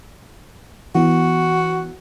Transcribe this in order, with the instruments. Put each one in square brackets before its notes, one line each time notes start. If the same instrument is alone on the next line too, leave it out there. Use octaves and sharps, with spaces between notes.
[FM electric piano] E3 B3 [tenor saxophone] F#4